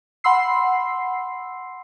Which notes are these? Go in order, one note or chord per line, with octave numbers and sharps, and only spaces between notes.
F#5 B5 C6 E6 C7